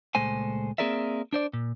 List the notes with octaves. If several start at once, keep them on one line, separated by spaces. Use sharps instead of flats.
C#2 A#2 G#3 A3 C5 G#5
A#3 C4 G#4 A#4 D5 E5
D4 C5 D5
A#2